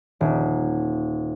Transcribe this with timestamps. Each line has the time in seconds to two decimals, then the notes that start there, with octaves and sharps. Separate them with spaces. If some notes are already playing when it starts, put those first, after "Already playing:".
0.21 D#1